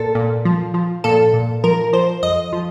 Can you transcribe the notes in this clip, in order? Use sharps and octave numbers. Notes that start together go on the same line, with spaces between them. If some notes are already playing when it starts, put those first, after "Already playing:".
Already playing: A#2 A4
A#2
F3
F3
A#2 A4
A#2
F3 A#4
F3 C5
F2 D#5
F3